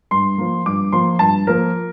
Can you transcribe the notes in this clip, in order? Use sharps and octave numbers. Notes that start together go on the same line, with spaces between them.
G2 C6
F3 A#3
G2 D6
F3 A#3 C6
G2 A5
F3 A#3 A#4